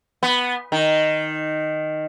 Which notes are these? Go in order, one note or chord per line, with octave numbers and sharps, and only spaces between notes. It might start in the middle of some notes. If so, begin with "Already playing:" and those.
B3
D#3